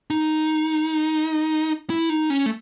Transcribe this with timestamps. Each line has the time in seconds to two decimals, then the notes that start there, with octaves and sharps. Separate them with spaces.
0.10 D#4
1.90 E4
2.10 D#4
2.30 C#4
2.46 A3